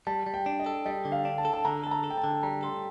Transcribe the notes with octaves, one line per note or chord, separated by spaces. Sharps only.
G3 A5
G3
G5
D4
D#5
A4
G3 D#5
D3
F5
D4
A5
A4
A5
D3 A#5
A4 A5
A#5
A4
G5
A5
D3
G3 A#5
A4 C6